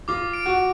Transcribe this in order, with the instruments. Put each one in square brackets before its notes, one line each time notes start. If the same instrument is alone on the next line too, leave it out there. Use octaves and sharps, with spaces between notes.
[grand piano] F4 [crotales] D6
[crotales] D7
[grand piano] F#4